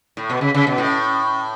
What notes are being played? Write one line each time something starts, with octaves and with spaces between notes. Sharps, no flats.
A2
B2
C#3
C#3
B2
A2